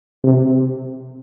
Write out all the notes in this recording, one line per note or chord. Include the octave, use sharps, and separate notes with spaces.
C3